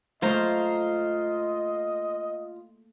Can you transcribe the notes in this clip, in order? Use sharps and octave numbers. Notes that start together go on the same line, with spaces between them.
A3 A#3 F4 C5 D#5 F5 A#5